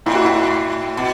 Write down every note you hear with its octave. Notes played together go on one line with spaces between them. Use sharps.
A2 E4
F#4
E4
B2